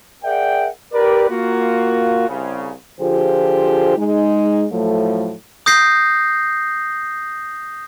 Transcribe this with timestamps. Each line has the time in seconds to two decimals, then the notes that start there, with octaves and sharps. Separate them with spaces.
0.24 G#4 A#4 D5 E5 F#5 G5
0.93 G4 A#4 B4 D5
1.29 A#3 F4 F#4
2.28 C2 C#3
3.00 D3 F3 F4 G4 G#4 C5
3.98 G#3 D#4
4.72 A2 F3 F#3 A3
5.66 D#6 G6 A#6 C7